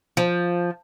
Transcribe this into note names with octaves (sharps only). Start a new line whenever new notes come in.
F3